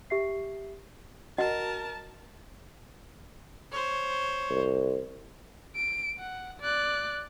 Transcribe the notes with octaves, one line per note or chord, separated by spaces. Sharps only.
G4 E5 C7
F#4 A#4 D#5 F#5 A5
C5 C#5
C2
D7
F#5
D5 F#6